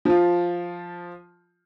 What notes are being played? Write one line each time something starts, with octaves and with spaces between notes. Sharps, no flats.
F3 F4